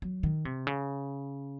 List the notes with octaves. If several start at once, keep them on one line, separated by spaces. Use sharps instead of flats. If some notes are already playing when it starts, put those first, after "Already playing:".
F#3
D#3
C3
C#3